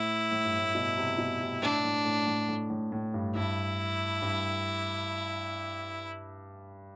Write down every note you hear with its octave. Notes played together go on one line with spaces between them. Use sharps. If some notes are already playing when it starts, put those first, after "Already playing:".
Already playing: A2 E4
A2
G2
A2
B2
C3
B2
C3
A2 D4
A2
A2
A2
A2
A2
A2
G2
G2 E4
G2